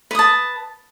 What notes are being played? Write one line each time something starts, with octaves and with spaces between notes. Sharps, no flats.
B4 A5 D#6